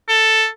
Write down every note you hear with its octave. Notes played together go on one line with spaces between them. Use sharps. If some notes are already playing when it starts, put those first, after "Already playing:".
A4